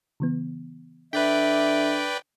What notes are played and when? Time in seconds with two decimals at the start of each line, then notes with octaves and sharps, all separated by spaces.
0.20 C#3 E3 B3
1.13 D3 B4 D5 E5 G5 F#6 B6